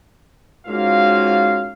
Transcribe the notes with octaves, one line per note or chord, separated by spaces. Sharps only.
G#2 A#3 C#4 F4 F#4 F5